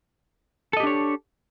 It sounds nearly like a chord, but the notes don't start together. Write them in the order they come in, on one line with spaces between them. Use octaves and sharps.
A4 D#5 G4 D4 C#5